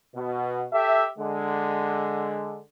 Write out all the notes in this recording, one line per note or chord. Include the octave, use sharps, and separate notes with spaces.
B2
G4 A4 E5
D3 G#3